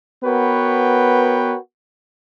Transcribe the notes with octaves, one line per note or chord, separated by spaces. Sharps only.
B3 F#4 A#4 B4 C#5 G5